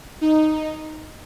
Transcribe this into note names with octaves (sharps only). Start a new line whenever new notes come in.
D#4